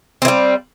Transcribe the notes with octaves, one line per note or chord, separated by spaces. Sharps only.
E3 G3 C4